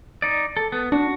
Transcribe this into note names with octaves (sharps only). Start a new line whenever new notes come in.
D#4 D5
A4
B3
D4 F#4